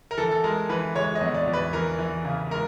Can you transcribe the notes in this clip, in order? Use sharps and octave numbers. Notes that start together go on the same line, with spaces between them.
A#4
E3 A4
A4
G#3 A#4
E3 B4
G#3 C#5
D#5
E2
D5
E2
B4
E3 A#4
E3
C#3
G#3 A#4